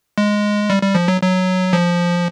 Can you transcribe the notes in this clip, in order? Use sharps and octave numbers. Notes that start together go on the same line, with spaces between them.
G#3
G3
G3
F3
F#3
F#3
F3